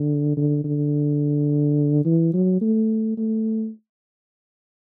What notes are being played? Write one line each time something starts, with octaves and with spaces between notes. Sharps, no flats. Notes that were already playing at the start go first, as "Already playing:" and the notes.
Already playing: D3
D3
D3
E3
F#3
A3
A3